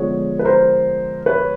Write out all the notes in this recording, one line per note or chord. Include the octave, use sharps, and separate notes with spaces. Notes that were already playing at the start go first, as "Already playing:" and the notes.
Already playing: D3 F3 G#3 B3 C#5
B4
A#4 C5
B4 C#5